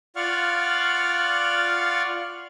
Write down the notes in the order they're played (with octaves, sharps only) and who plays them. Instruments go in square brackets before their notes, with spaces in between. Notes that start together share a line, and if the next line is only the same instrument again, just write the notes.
[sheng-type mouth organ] F4 D5 F5 F#5 C#6 F6